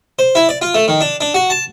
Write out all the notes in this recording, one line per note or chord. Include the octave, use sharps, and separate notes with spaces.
C5
E4
D5
F4
A3
D#3
D4
D4
F#4
A5